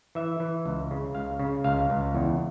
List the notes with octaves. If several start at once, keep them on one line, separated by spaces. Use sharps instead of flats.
E3 E5
E3
C#2
C#3
C#2 F5
C#3
C#2 F5
C#2
E2